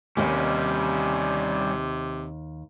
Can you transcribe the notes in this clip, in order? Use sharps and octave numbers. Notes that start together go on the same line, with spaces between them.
D#2 C3 G3 C#4 B4 D#5